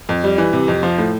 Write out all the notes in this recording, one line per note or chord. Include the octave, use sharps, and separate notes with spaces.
F2
G3
E3
C3
F2
F3
A2